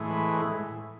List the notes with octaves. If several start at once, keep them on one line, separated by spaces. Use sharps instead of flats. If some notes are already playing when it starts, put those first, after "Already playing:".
Already playing: A2 E3 G#3
B4